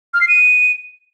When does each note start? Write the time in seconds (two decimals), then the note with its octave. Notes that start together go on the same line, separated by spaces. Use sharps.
0.14 F6
0.21 C7
0.28 D#7